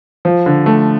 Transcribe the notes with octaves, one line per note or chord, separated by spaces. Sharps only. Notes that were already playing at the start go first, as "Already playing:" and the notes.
F3
D3
A3